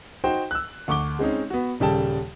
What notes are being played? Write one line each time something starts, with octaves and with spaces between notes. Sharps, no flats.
D#4 F#4 C5 G5
E6 F#6
D2 C#6 D6 G7
G#3 C4 C#4 D#4
B3 F#4
D#1 C#3 G3 A4 G5 A5